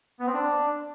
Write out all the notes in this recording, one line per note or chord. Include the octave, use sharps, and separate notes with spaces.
B3
C4
D4